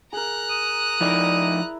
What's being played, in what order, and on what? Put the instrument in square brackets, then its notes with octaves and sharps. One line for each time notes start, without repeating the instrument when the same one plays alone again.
[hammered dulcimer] G#4 A#4 [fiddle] A#5 F#6
[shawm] D#6
[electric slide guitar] F3 D#4 [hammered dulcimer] E4 D5 E5